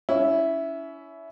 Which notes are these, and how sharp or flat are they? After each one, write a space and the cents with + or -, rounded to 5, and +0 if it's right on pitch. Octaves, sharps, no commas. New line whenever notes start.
C#4 +30 E4 +0